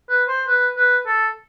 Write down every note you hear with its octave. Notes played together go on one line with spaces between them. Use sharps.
B4
C5
B4
B4
A4